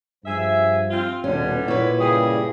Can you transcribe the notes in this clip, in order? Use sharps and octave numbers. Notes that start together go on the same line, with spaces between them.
G2 F3 G#4 E5
C4 F4
D#1 B2 D3 G3 C#4 D4
A#2 E4 B4 C#5
G2 C#3 G3 G4 G#4